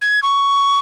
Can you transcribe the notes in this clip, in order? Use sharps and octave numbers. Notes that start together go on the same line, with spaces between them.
G#6
C#6